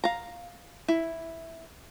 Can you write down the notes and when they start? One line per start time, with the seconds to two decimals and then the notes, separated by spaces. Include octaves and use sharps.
0.04 F5 A#5
0.88 E4